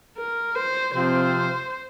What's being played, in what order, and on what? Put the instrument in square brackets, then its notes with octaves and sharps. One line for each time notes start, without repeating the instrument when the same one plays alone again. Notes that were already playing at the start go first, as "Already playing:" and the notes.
[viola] A#4
C5
[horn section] C3 F3 C4 F4 [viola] C5